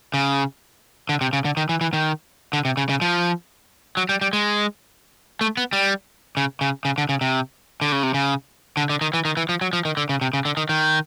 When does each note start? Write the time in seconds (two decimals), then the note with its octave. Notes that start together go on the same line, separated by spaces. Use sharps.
0.14 C#3
1.09 D3
1.21 C3
1.33 C#3
1.45 D3
1.57 D#3
1.69 E3
1.81 E3
1.93 D#3
2.53 D3
2.65 C3
2.77 C#3
2.89 C#3
3.01 F3
3.97 F#3
4.09 G3
4.21 G3
4.33 G#3
5.41 A3
5.57 B3
5.73 G3
6.37 C#3
6.61 C#3
6.85 C#3
6.98 D3
7.09 C#3
7.21 C3
7.81 D3
7.92 C#3
8.03 C3
8.14 C#3
8.77 D3
8.90 D3
9.01 D#3
9.14 E3
9.25 D#3
9.37 E3
9.49 F3
9.61 F#3
9.73 F3
9.85 D#3
9.97 D3
10.09 C#3
10.21 C3
10.33 C#3
10.45 D3
10.57 D#3
10.69 D#3